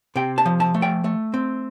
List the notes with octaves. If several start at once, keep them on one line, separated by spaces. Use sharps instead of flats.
C3 G5
A5
F3
A5
A3
G5
A3
C4